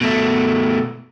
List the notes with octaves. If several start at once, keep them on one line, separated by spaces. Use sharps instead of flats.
B2 A3